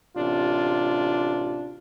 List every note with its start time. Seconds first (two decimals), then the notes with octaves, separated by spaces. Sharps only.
0.16 A1 C3 D4 F4